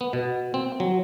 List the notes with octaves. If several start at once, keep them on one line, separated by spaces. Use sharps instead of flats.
B3
B2
C4
F#3